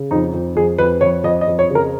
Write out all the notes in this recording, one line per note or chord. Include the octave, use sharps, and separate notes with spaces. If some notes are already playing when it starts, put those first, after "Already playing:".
Already playing: C#3
F2 D#4
F2
F2 G#4
F2 B4
F2 C#5
F2 D#5
D#5
F2
C#5
C#3
A#4